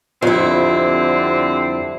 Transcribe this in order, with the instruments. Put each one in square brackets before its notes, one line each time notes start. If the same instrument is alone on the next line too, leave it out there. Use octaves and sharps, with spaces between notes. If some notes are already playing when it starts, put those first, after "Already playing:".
[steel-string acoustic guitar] F2 E4 [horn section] D3 G3 C4